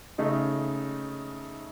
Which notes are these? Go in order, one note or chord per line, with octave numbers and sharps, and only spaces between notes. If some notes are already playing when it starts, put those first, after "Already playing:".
C#3 A3 D#4